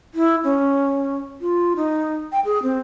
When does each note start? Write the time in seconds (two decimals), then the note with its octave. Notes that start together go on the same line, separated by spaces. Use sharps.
0.14 E4
0.44 C#4
1.41 F4
1.76 D#4
2.32 G5
2.45 G#4
2.63 C4